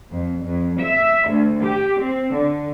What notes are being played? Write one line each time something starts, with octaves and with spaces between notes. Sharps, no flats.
F2
F2
E5
D2
G4
C4
D3